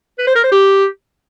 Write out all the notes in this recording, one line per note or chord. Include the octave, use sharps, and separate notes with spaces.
B4
C5
A#4
C5
G4